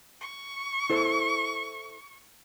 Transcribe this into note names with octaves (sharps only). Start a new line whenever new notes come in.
C#6
E4 A4 C5